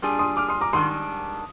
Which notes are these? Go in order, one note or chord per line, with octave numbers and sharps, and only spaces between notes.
A#2 G3 D4 G#4
C6 D#6
D6 F6
C6 D#6
A#5 D6
G#2 D#3 G3 D4 C6 D#6